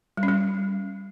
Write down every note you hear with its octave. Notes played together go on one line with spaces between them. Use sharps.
G3
C#4
G3